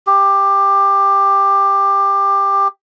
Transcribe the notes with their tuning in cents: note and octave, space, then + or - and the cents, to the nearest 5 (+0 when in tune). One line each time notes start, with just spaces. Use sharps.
G4 +15